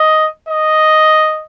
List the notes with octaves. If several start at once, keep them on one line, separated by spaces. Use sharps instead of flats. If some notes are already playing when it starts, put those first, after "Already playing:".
Already playing: D#5
D#5